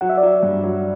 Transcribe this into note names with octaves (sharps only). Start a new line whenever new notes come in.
F#3 F#5
E5
D5
F#3 E5
G2
F#3